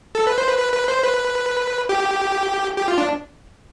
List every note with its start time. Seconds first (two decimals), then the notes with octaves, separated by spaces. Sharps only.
0.15 A4
0.27 B4
0.38 C5
0.48 B4
0.58 B4
0.73 B4
0.88 C5
1.03 B4
1.89 G4
2.77 G4
2.88 F4
2.98 D4